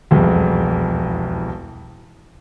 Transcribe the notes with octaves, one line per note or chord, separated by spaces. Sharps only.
E1 C2 F2